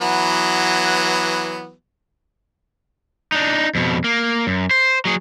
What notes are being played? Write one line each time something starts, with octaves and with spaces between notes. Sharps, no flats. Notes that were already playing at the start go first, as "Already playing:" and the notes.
E3 F#3 B3
D4 D#4
F2 B2
A#3
F#2
C5
F#3 G#4